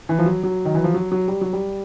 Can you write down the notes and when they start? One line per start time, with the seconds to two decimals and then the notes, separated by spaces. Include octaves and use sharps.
0.09 E3
0.19 F3
0.26 F#3
0.44 F#3
0.65 D#3
0.75 E3
0.84 F3
0.94 F#3
1.12 F#3
1.28 G3
1.41 F#3
1.53 G3